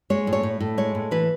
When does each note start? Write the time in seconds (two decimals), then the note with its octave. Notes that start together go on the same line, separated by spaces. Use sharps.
0.10 G#3 C#5
0.27 A2
0.33 C#5
0.43 A2
0.60 A2
0.77 G#3 C#5
0.95 A2
1.11 E3 B4